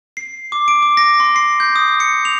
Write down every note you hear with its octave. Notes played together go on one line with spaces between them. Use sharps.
C7
D6
D7
D6
A#6
C6
C7
G6
D#6
C#7
F7